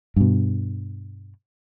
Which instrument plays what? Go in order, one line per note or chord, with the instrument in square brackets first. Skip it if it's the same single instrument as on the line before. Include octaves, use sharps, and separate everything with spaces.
[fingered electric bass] G2 B2